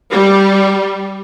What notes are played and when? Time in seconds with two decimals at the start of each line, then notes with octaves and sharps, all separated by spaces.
0.12 G3